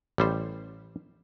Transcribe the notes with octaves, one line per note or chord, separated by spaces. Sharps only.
A1 G3 C5